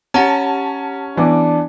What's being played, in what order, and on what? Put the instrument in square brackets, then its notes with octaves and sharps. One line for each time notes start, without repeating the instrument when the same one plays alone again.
[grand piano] C#4 [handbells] G4 F#5 A#5 [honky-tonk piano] A5
[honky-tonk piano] E3 B3 D6 [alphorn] D4